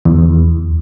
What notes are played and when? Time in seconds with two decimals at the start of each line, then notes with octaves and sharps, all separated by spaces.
0.05 E2